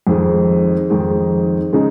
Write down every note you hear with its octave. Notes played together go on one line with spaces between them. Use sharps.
F2 D#3 G#3
F2 D#3 G#3
C#3 G#3 D#4